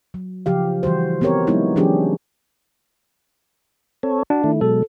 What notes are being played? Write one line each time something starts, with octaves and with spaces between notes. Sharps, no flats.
F#3
C#3 F3 G4 F5
E3 G3 F#4 C5
B3 C4 G4 A#4 C#5
F#3 G#3 B3 D#4 E4
E3 F#3 C#4 D4 G4 G#4
C4 A4 C#5
D4 F#4
D#3 A3 E4
B2 F#3 G#3 A4